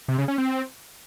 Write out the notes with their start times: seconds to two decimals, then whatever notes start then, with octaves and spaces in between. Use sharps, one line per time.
0.08 C3
0.18 C#3
0.28 C#4
0.38 C4